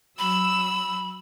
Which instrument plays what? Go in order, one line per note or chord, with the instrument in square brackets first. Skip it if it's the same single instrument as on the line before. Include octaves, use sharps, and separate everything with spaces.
[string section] F#3 E6 [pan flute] B5